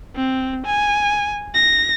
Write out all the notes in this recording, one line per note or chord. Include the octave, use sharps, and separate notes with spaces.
C4
G#5
A#6